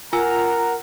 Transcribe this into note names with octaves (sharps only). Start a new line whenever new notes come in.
F4 A#4 F#5 G#5 A#5 E6